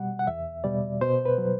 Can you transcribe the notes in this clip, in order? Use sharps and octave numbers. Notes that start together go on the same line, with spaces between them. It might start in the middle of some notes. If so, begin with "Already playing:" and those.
Already playing: B2 G3 F#5
F#5
E2 E5
B2 G3 D5
B2 C5
B4
F#3